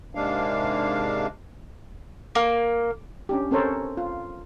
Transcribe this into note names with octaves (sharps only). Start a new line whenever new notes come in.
G#2 C3 G#3 A#3 D4 F5
A#3
C#4 D4 G4
C4 C#4 A4 A#4 C5 C#5
F4